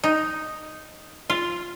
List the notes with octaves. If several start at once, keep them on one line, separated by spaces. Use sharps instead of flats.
D#4
F4